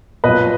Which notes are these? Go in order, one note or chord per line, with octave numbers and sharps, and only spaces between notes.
A#2 F#3 B4 D#5